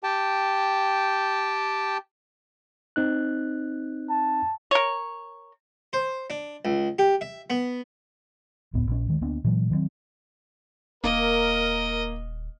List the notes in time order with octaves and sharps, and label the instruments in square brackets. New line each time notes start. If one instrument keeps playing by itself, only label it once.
[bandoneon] G4 G5 A5
[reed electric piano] C4 D#4 F#6
[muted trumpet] A5
[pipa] A#4 C#5
[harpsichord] C5
D4
C#2
G4
E5
B3
[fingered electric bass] E1 C#2 A2 B3
A#1 C#4
D2 D#3 G#3
D2 A#3 B3 D4
A#2 E3 F#3 G#3
D#3 F#3 A#3 C4
[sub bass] D#1 [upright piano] A#3 [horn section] A#4 [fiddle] D#5